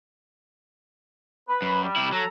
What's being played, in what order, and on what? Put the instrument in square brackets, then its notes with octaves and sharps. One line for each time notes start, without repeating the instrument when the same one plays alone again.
[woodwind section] B4
[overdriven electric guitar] F#2
[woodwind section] G3
[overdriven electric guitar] C3 E4
[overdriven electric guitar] F#3 [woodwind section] A4 A#5